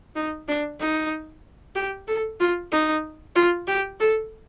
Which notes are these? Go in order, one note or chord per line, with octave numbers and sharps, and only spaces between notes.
D#4
D4
D#4
G4
A4
F4
D#4
F4
G4
A4